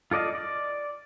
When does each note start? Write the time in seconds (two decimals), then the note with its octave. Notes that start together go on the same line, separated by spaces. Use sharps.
0.11 F4 A4 D5 D#5 F5
0.35 D5